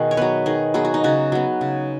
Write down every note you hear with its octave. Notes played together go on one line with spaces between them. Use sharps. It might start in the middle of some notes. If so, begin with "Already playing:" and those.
Already playing: B2 D#3 D#4 F#4 G#4
C#5
F#3 B3 B4
D#3 G#4
F#3 B3 G#4
F#4
D#4
C#3 F#4
F#3 B3
C#3